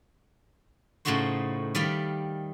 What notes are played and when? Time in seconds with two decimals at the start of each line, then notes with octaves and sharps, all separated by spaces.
1.05 A2 C#3 A3 D#4 F#4 C5
1.75 D#3 G3 D5 F5 B5